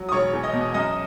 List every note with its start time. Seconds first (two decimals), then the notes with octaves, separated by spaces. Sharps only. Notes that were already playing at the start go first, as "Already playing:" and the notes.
Already playing: F#3
0.09 D#6
0.12 E1 C#5 C#6
0.33 E2
0.43 D#5 D#6
0.53 B2
0.74 F#2 D#5 D#6